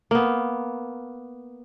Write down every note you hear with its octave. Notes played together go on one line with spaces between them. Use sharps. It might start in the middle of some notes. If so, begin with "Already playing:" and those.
A#3 B3